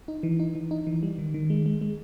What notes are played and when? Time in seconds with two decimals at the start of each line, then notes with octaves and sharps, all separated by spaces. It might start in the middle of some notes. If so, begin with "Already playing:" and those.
0.08 D#4
0.23 E3
0.40 D#4
0.55 E3
0.71 D#4
0.87 E3
1.03 G3
1.18 D#3
1.34 D#3
1.50 G#3
1.66 G#3
1.81 G#3